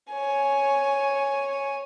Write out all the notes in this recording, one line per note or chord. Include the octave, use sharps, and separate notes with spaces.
C#5 G#5